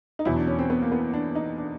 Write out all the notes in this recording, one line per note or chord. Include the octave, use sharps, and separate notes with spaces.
D#4
E2 B2 F#3 E4
D4
C#4
C4
B3
A#3
B3
D4
D#4
D4